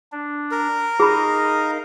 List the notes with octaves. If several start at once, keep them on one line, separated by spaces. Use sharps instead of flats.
D4
A#4
D#4 G#4 D#5 F5 B5